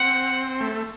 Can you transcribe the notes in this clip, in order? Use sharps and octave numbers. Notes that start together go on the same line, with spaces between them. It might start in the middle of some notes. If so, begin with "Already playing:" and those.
Already playing: C4 F#5
A3